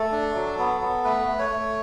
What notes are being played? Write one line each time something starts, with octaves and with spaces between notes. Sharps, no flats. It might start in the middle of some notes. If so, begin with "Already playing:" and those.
Already playing: A3 A4
D4
F#3
B3
B3
A3 B4
A3
C#5
A3